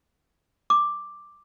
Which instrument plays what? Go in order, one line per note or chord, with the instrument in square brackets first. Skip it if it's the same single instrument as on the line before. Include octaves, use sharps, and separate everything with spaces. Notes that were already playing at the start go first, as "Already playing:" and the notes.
[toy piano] D6